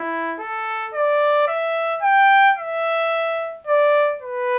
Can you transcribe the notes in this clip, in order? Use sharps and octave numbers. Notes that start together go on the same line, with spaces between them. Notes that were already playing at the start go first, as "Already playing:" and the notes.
Already playing: E4
A4
D5
E5
G5
E5
D5
B4